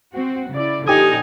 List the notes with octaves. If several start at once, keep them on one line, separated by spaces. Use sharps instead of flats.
C4 F#4
C#3 E4 D5
A#2 D3 F3 D#4 G4 G#5 D#6